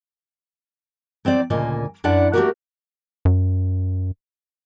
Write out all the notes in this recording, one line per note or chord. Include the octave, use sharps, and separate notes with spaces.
F#3 C4 C5 D5
D2 A#2 C#3 A#3 D#5 G#5
F#2 D4 E4 D5 F#5
A3 A#3 C#4 F#4 G4 A#4
F#2